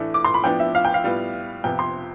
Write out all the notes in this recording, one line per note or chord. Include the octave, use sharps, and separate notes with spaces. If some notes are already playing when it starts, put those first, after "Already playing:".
Already playing: A2 E3 A3 D4
D6
C6
B5
A2 F3 B3 D4 G5
E5
F5
G5
F5
A2 G3 B3 F4
F2 C3 F3 B3 G5
C6